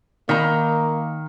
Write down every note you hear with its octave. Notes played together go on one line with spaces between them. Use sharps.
D#3 A#3 A#5